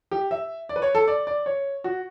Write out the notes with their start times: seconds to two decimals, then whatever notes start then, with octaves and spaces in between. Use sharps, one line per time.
0.11 G4
0.31 E5
0.69 D5
0.76 B4
0.82 C#5
0.95 A4
1.08 D5
1.27 D5
1.46 C#5
1.84 F#4